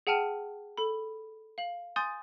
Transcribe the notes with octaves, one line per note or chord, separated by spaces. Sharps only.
G#4 F#5 G5 A5 F6 D#7
A4 B5
F5 F#7
G#5 C6 D#6 G6 A6